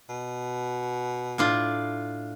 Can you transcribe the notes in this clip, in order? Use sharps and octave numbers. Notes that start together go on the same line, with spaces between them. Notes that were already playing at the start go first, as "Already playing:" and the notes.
B2
A2 D4 F4